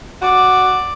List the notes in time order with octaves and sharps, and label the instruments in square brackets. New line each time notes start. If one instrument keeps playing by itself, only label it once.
[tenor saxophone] F#4 [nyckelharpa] D5